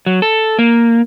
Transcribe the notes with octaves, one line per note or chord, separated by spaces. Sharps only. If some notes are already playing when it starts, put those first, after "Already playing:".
F#3
A4
A#3